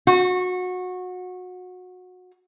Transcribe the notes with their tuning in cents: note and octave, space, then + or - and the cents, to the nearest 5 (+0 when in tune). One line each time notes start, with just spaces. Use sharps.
F#4 -25